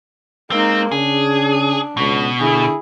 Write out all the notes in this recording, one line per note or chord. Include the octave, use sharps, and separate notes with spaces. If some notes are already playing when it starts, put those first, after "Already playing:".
G#3 A#3 C4 D#4
C#3 D4 G#4
C#2 B2
D3 E4 G#4